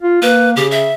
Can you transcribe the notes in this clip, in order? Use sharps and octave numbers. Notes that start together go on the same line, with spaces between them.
F4
A#3 B4
C#3 G4
E5